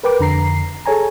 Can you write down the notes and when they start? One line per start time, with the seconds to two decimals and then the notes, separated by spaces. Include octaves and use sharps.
0.03 A#4 B4 G5 D6
0.20 F2 D3 A#5 C7
0.85 G#4 A4 C#5 G#5 A#5